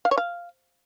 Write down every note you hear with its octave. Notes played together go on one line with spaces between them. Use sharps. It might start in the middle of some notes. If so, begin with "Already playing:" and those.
F5
C#5
F5